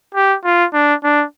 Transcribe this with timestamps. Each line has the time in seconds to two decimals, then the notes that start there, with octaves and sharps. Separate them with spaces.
0.15 G4
0.44 F4
0.74 D4
1.04 D4